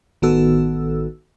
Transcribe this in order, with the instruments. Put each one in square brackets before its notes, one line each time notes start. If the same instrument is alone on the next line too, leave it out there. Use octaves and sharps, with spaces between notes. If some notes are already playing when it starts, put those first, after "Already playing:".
[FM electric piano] A1 D#3 B3 F#4 A4 E6